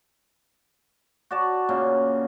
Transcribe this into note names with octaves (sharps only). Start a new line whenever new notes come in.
F#4 D5 A5
A#2 C#3 A#3